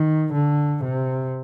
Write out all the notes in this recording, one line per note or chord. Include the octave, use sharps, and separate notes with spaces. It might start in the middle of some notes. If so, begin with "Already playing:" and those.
Already playing: D#3
D3
C3